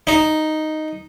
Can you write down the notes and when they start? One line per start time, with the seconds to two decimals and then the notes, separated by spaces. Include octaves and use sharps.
0.07 D#4